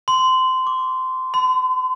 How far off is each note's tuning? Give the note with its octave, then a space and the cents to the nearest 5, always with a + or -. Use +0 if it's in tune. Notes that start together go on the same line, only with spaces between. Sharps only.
C6 -20
D6 -25
C6 -45